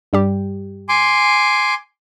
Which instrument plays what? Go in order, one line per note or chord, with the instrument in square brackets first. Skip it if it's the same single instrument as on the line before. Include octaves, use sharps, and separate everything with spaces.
[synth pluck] G2 G3 G4
[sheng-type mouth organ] G#5 C6 D6